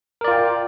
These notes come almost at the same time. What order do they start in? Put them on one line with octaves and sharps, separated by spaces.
A#4 D5 F4 G5